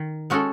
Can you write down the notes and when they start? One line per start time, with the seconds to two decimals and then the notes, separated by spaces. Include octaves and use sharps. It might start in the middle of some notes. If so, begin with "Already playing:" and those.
Already playing: D#3
0.30 G#3 C#4 F#4 A4